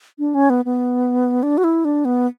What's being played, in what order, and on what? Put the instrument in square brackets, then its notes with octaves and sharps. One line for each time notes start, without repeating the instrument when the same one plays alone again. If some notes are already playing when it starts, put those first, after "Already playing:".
[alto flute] D4
C#4
B3
B3
D4
F#4
E4
D4
B3